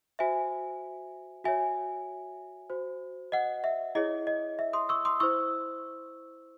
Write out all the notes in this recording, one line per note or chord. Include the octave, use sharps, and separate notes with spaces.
F#4 C5 E5 G#5
F#4 C#5 E5 G#5
F#4 C5
D#5 F#5
E5
E4 G#4 C#5 D#5
D#5
E5
C6 D#6
C#6 E6
C6 D#6
E4 C5 C#6 E6